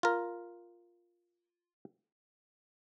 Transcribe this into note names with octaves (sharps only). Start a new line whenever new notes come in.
F4 A#4